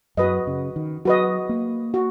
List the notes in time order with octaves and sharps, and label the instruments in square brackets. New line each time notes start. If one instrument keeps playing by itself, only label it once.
[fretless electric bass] F#2 [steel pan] F#4 B4 D#5
[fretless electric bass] C#3
D#3
[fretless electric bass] F#3 [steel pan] F#4 B4 D#5
[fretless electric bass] A#3
[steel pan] F#4